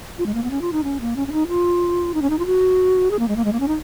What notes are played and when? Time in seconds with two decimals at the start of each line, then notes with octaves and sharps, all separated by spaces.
0.18 F4
0.26 G#3
0.34 A#3
0.44 B3
0.51 C#4
0.61 F4
0.73 D#4
0.84 C#4
1.00 A#3
1.16 C#4
1.27 C#4
1.32 D#4
1.48 F4
2.14 D#4
2.22 C#4
2.30 D#4
2.39 F4
2.46 F#4
3.11 G#4
3.19 A#3
3.28 G#3
3.36 A#3
3.45 G#3
3.53 A#3
3.60 C#4
3.68 D#4